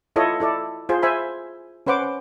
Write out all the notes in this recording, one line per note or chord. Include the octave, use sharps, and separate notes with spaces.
E4 F4 A4 C#5 D#5
E4 A4 D5
F4 G#4 C5
C5 E5 G#5 B5
C#4 B4 C5 F#5 D6